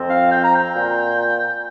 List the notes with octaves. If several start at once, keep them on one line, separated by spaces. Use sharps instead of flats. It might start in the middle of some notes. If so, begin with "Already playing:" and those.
Already playing: F2 F3 C4
F5
G5
A#5
G5
A#2